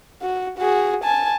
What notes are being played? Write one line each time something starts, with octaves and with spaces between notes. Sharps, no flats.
F#4
F#4 G#4
G#5 A5